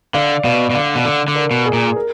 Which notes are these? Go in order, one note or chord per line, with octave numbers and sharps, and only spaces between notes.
D3 D5 F5
B2 D5 F5
B2
D3 D5 F5
B2
D3
D3
A#4 D5
B2
G#4
A#2
A#4